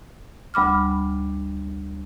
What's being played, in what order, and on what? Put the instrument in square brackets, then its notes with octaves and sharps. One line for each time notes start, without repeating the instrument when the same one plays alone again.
[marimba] D2 G3 B5 D6 F6